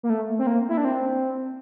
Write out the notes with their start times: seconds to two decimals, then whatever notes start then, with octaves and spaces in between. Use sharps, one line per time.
0.03 A#3
0.10 A3
0.39 C4
0.47 A#3
0.69 E4
0.77 D4
0.85 C4